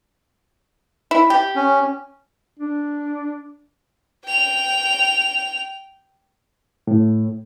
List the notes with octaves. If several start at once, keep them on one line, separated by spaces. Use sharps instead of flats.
E4
G4
C#4
D4
G5 F7
A2